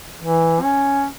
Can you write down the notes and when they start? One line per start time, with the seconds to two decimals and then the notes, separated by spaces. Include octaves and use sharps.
0.20 E3
0.62 C#4